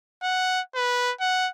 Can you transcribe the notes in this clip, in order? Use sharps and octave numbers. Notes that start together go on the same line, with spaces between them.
F#5
B4
F#5